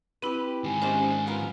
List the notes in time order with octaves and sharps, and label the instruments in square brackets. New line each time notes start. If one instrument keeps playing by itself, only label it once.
[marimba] C4 E4 [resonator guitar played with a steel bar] G4 B4
[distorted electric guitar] G#2 D#3 [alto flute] G#5
[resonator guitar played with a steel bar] G#3 A#3 D4 [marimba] C#4 G4 C5
[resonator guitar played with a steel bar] B3 F4 A#4